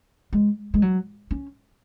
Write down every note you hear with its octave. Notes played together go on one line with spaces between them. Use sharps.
G#3
G#3
F#3
C#4